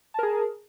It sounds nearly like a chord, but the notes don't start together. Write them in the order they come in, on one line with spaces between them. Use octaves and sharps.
A5 A#4 G#4